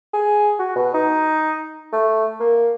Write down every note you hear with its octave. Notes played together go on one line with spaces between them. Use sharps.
G#4
F#4
B2
D#4
A3
A#3